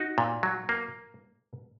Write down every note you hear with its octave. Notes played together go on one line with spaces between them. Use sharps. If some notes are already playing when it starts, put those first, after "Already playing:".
Already playing: D#4 F#4
A#2
F#3
A#3